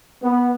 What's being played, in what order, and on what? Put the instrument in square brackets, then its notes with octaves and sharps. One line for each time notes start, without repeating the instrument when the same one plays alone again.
[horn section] B3